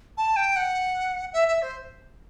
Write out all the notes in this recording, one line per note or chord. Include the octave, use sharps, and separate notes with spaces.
A5
G5
F#5
E5
E5
C5